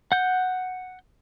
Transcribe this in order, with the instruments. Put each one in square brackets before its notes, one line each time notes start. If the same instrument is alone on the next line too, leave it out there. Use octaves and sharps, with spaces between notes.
[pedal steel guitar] F#5 G6